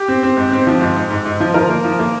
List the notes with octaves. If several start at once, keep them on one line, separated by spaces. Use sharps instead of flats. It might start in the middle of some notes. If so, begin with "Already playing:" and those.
Already playing: G4
C4
C4
G#2
C4
F3
G#2
G#2
G#2
G#2
F3
F3 A#4
A#3
F3
A#3